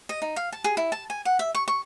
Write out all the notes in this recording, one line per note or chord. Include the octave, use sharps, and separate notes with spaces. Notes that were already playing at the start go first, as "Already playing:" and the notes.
D#5
D#4
F5
A5
G#4
E4
A5
G#5
F#5
E5
C#6
C#6